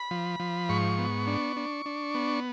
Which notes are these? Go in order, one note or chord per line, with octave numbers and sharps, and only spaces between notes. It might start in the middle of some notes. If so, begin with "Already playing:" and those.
Already playing: B5
F3
F3
G#2 C#6
B3
D4
D4
D4
B3